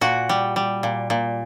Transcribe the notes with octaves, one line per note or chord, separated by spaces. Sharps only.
A#2 F#4
G3
G3
A#2
A#2